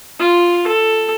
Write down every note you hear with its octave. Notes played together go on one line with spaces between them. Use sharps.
F4
A4